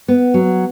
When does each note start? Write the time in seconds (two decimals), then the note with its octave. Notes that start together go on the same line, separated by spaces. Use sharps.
0.08 B3
0.34 F#3